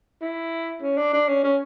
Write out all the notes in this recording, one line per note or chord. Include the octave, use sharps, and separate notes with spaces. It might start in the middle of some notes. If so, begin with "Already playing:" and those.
E4
C#4
D4
D4
C#4
C#4